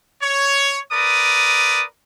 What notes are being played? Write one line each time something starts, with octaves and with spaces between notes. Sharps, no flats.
C#5
A#4 B4 D5 D#6